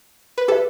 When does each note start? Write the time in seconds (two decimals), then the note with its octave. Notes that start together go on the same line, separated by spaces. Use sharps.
0.38 B4
0.48 G4 A4 B4 E5